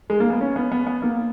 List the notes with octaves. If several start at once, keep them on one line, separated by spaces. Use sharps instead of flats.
G#3
A#3
B3
C#4
B3
B3
B3
A#3